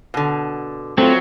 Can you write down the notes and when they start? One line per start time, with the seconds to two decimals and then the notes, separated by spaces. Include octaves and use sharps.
0.14 B2 D3
0.98 F#3 A3 C4 F4